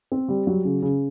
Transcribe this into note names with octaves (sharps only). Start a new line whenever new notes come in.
C4
G3
F#3
C#3
C#3